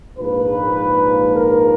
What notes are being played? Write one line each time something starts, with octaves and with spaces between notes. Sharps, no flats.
A#1 G#2 F3 A#3 B4
A#4